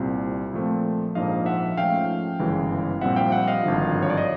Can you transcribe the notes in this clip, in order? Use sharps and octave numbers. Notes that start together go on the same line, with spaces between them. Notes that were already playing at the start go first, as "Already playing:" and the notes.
Already playing: C2 A#2 G3 C4
A#2 F3 A3 C4
A#1 G#2 F3 A#3 D4 D#5 F5
E5 F#5
G#2 F3 A3 C#4 F5 G5
G1 F#2 C#3 E3 G#3
A#1 A#2 G3 C4 E5 F#5
F5 G5
E5 F#5
D#5 F5
G#1 G2 D3 F3
C#5
D5
D#5